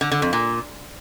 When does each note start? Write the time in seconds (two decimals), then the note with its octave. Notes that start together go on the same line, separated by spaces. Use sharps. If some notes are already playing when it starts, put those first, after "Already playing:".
0.01 D3
0.12 D3
0.22 F2
0.33 A#2